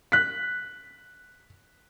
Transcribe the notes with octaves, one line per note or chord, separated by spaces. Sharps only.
F#6 B6